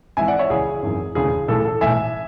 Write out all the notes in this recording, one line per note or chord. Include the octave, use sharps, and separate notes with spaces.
G#1 G#2 E3 E5 G#5
D5 F#5
C#5 E5
C#2 C#3 E3 G#4
G#1 F#2 E3
E1 D2 C#3 E3 G#4
B1 A2 E3 A4
A4
B1 A2 E3 E5 G#5